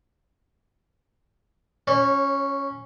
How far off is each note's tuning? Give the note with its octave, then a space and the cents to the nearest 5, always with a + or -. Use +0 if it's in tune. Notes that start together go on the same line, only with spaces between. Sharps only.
C#4 +0 C#5 -30